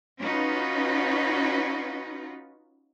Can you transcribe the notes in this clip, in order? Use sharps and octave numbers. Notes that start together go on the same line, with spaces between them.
C#4 D#4 F4 F#4 B4